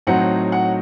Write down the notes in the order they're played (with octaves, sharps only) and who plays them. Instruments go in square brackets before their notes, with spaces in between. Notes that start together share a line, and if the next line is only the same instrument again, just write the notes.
[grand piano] A2 F#3 C4 D#4 F#5
F#5